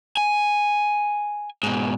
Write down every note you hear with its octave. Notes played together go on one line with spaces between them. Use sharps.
G#5
G#2 B2